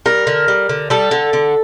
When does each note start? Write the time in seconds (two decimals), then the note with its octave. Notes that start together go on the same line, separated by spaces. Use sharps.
0.06 G3 A#4
0.27 D3
0.48 G3
0.69 D3
0.90 G3 A4
1.11 D3
1.33 D3